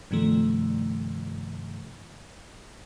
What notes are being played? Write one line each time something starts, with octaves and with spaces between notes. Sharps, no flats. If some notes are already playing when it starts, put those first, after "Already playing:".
G2 C3 D#3 F3 A3